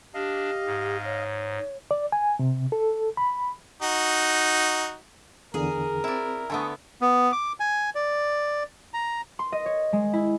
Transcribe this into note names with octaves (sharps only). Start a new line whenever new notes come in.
D4 G4 D#5 F5
G#2
C#5
D5
G#5
C3
A4
B5
D#4 F#4
E2 D3 G#4 A#4
C4 E4 D5
D3 A3 B3 G#5 C#6 D#6
B3
D6
G#5
D5
A#5
C6
D#5
C#5
G#3
E4